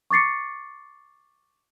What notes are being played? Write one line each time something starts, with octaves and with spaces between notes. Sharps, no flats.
C#6 D6 A6 C7 C#7